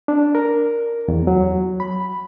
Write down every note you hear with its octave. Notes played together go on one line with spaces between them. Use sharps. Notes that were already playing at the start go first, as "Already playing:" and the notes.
D4
A#4
E2
F#3
B5